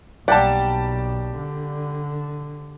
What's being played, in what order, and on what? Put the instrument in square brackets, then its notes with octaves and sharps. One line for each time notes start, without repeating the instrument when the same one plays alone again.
[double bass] B1 [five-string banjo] G3 A#3 F#5 [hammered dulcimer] G4 [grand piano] D5 A5
[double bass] D3